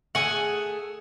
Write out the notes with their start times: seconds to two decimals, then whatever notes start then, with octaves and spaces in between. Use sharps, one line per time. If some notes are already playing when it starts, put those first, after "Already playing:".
0.15 A3 G#4 F#5 G#5